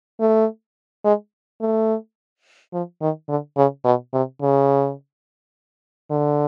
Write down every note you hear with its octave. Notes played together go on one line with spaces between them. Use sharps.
A3
G#3
A3
F3
D#3
D3
C#3
B2
C3
C#3
D3